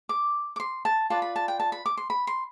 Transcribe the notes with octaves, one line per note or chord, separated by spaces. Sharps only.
D6
D6
C6
A5
F4 B4 D5 A5
B5
A5
G5
A5
B5
D6
C6
B5
C6